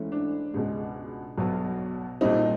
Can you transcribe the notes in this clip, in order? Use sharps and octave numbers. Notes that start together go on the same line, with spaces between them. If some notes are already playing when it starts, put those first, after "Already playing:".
Already playing: G#2 E3 A3 C#4
D4
C#2 B2 G#3
B1 B2 F#3 B3
B1 A#2 G3 C4 D#4